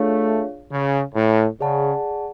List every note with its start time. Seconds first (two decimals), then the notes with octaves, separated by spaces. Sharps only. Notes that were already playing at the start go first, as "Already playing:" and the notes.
Already playing: A3 D4 F4 G#4 C#5 F5
0.71 C#3
1.15 A2
1.61 C#3 G#4 D5 F#5 A5